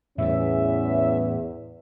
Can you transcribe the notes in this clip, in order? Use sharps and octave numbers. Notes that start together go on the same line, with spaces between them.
E2 A2 G3 C#4 E5